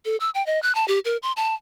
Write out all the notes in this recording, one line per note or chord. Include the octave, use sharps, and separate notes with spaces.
A4
E6
G5
D#5
F#6
A5
G4
A#4
C6
A5